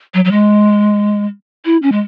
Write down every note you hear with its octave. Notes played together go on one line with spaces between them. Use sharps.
F#3
F#3
G#3
E4
C#4
G#3